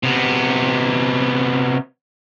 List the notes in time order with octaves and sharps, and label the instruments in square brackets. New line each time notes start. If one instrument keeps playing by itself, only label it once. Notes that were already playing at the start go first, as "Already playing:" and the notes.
[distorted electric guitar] C3 B3